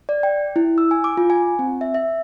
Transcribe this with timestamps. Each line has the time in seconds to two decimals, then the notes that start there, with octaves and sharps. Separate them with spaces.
0.09 D5
0.23 G5
0.56 E4
0.78 E6
0.91 G#5
1.04 D6
1.17 F4
1.30 G#5
1.59 C4
1.81 E5
1.94 E5